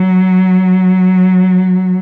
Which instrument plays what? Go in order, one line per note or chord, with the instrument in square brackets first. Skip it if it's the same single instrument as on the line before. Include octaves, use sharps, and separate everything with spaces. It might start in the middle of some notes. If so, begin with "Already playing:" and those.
Already playing: [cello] F#3